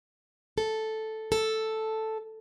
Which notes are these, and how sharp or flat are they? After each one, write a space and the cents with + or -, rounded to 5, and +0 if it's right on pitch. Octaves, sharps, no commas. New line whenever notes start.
A4 -5
A4 +0